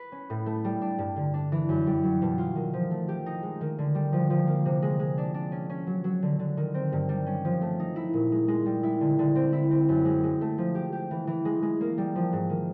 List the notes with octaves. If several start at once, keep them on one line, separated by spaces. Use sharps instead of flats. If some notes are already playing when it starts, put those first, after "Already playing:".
Already playing: B4
C#4
A2
A3
G3
D4
G2
D3
D4
E3
F#2
G3
F#3
B2
F4
D#3
F3
A3
G4
D#4
G#3
D#3
D3
G3
F3
F3
A#3
C3
G#3
G#3
D4
D4
C#4
C#4
F#3
F#3
D3
D3
D#3
C4
G2
G3
C#4
F3
A3
D#4
E4
A#2
G#3
G#3
G3
E4
D3
D3
C4
E4
C4
F#2
G#3
G#3
A3
F3
G4
G4
E3
E3
G#3
G#3
A#3
G3
F3
G#2
D#3